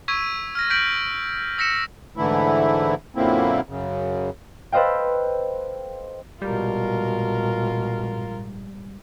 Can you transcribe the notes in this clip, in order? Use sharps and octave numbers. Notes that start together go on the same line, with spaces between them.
C#6 E6 G#6 B6 D#7
F6 A#6
F6 G6 B6 D7 F#7
E6 A#6 B6 C#7 E7
G#2 D3 E3 A3 E4
F#2 A#2 D3 A#3 C4 E4
F#2 C#3
A4 B4 C5 D#5 F5 G5
A#1 G#2 B2 G3 G#3 F4 A#4